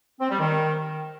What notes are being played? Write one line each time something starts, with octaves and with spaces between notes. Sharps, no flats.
C4
G3
D#3